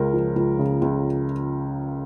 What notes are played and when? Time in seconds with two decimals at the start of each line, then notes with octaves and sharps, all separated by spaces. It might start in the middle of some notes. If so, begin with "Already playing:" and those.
Already playing: C#2 C#3 A#4
0.13 F3
0.36 C#2
0.59 C#3
0.82 C#2